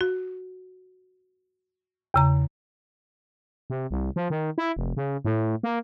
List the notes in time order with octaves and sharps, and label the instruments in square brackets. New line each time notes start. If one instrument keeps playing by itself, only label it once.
[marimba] F#4
E2 C#3 A#5
[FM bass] C3
C2
F3
D#3
E4
F1
C#3
A2
A#3